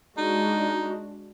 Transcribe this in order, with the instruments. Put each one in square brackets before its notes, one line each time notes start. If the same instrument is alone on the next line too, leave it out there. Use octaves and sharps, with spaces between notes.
[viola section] G#3 D4 F#4 [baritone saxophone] D#4